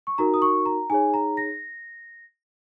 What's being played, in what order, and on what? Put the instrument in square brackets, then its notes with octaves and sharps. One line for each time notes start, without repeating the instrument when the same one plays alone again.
[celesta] C#6
D#4 F#4 A#4 A#5
D#6
C#6
A#5
D#4 G#4 C#5 G#5
A#5
A#6